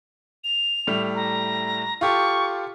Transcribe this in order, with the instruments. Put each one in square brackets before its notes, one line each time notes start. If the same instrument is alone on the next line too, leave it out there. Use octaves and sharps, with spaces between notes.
[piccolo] F7
[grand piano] A2 G3 A3
[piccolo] A#5
[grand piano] F4 G4 A4 [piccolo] C#6